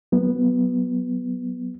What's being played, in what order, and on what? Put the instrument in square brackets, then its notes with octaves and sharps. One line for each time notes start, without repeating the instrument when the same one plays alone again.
[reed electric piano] F#3 B3